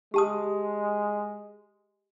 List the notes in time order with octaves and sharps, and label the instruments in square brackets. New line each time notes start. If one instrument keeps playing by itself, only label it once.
[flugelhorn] G#3 [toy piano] G4 A5 D#6